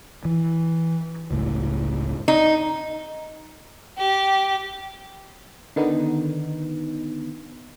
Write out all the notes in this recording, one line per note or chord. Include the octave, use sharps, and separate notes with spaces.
E3
F#1 C#2 A2
D#4
G4
D3 D#3 B3 D#4